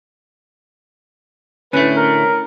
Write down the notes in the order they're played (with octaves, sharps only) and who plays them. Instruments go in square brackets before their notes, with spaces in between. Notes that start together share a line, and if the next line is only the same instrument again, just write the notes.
[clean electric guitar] D2 A2 A3 [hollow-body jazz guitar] C#4 [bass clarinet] B4
[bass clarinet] A#4